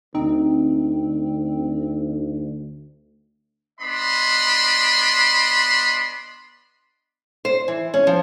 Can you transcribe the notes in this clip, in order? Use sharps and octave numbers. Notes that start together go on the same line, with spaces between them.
D2 C4 D#4
B3 D4 D#5 B5 C6
C5
E3
C#4
F3